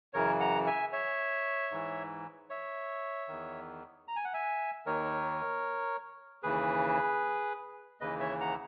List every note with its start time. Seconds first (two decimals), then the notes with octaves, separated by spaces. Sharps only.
0.14 F#2 C#3 E3 A#4 C#5
0.40 F#5 A#5
0.67 E5 G#5
0.93 C#5 E5
1.71 G#2 E3
2.50 C#5 E5
3.28 E2 D#3
4.08 A#5
4.16 G#5
4.25 F#5
4.34 E5 G#5
4.86 D#2 D#3 A#4 C#5
6.43 D#2 C#3 E3 G#4 B4
8.01 D#2 C#3 E3 B4 D#5
8.20 C#5 E5
8.41 F#5 A#5